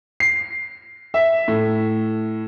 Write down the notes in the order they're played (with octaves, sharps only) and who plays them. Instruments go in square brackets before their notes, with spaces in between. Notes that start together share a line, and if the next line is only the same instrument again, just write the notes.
[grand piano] C7
E5
A2